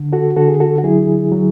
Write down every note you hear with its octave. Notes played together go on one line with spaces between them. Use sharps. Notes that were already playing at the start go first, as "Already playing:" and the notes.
Already playing: D3
F#4 A4
D3 F#4 A4
G#4
F#4 A4
F#4
F#3 E4 G#4
F#3